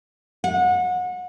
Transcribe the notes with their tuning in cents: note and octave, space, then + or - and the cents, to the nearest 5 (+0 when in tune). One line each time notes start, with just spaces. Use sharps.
F#5 -30